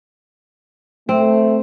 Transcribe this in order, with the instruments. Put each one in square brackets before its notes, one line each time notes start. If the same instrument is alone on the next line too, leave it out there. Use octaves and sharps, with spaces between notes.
[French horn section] A3 [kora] C4